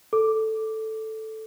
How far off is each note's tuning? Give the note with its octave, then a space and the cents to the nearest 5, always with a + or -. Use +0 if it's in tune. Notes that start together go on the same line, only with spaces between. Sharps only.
A4 +0 D6 +0